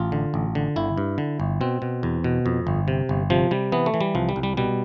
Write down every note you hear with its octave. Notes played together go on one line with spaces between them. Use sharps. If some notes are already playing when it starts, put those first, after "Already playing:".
Already playing: A1 F4
D3
A1
D3
G1 E4
G2
D3
G1
B2 C4
B2
E2
B2
F2
G1
C3
G1
C3 F3
C3 G3
E3 B3
A3
E3
G3
C2 F3
G3
C2
G3
B2 G3